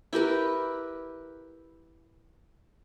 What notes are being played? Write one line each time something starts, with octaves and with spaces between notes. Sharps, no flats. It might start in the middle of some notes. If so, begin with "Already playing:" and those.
E4 G4 A#4 B4